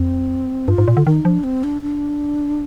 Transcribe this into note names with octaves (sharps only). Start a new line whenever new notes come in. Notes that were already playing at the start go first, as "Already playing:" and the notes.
Already playing: F2 C4
G2 F4
G#2
A#2
D3
D#3 D#4
F3 D4
C4
D4
D4